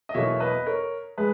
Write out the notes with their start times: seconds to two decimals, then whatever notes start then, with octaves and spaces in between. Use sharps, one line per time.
0.09 D#5
0.14 E2 B2 F#3 A#3 C#5 E5
0.40 B4 D#5
0.66 A#4 C#5
1.18 G#3 G#4 B4